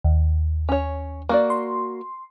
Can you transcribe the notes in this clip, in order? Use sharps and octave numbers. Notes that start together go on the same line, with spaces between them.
D#2
C#4 C#5
A#3 F#4 D5
C6